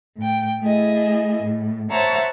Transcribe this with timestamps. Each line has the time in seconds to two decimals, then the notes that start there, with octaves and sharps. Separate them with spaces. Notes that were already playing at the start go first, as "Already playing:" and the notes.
0.18 A2 G5
0.61 A3 E4 G#4 D#5
1.42 A2
1.91 C5 C#5 E5 F#5 A5 A#5